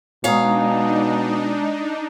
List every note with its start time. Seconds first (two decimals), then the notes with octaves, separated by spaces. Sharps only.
0.24 B2 G#3 D4 D#4 C#5 F5 A#5 D#6